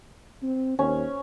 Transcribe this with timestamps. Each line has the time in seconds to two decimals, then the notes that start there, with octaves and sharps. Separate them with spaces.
0.42 C4
0.79 D#2 C#4